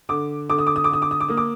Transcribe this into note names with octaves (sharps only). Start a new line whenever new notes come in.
D3 D6
D3 D6
D#6
D6
D#6
D6
D3 D#6
D6
D#6
D6
A#3 D#6
D6